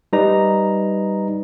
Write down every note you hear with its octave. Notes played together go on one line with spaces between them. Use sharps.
G3 D#4 B4 A#5